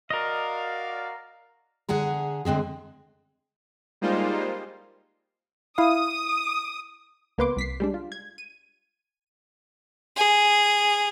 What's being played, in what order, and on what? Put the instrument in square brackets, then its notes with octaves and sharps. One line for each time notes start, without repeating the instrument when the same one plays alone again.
[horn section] F#4 D5 F5 [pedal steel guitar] A#4 D#5
[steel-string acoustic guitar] D3 G#4 F#5 G#5 A#5
D3 G#3 C4 G#4
[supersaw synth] G3 G#3 A#3 D#4 F4 C5
[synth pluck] E4 F5 [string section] D#6
[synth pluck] C#2 A#3 B3 B4 C6 D6
C2 B6 C7
G3 G#3 D4
F4
G#6
D#7
[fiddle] G#4